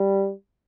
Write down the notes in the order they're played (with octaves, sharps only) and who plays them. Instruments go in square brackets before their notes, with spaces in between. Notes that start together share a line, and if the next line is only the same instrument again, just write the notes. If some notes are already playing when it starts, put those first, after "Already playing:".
Already playing: [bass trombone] G3